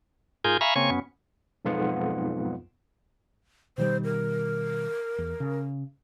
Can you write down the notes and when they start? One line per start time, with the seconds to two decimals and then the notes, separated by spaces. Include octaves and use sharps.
0.44 G#2 F4 G#4 A#4 G#5 G6
0.61 E5 F5 G#5 A#5 B5 C#6
0.76 C#3 A#3 C4 C#5 G#5 C#6
0.90 F#2 B3 C#4
1.65 B1 F2 G#2 B3 F4 F#5
3.78 B2 D#3 G3 C5
4.04 A#4
5.18 E2
5.40 C#3